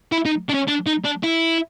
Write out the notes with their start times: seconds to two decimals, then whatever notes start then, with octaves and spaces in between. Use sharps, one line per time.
0.12 E4
0.25 D#4
0.49 D4
0.53 C#4
0.68 D4
0.87 D#4
1.05 D4
1.24 E4